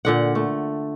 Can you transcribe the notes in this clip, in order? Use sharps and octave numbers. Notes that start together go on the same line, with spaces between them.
A#2 D3 F#5
A3